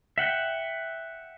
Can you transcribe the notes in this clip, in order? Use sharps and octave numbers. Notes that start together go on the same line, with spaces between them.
E5 F#5 G5